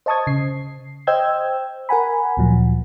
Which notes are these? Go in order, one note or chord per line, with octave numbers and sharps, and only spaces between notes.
C5 D#5 A5 C#6 D#6 G#6
C#3 C7
C5 D#5 G5 E6 G6 G#6
A#4 F#5 G#5 B5
D2 A#2 F3 F#3